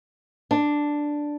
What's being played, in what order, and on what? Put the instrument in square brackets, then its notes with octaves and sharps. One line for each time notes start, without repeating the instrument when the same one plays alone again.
[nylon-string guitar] D4